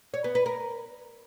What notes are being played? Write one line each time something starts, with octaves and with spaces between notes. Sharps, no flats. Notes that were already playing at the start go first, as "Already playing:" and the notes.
C#5
B3
B4
A#4